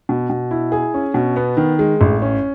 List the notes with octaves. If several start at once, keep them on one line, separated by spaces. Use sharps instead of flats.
B2
B2
E4
G#4
C#4
B2
B3
D#3
G#3
A1
C#4